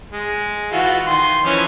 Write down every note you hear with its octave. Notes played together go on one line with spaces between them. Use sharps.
G#3
E3 F4 F#4
D#3 C6
E3 F3 C#4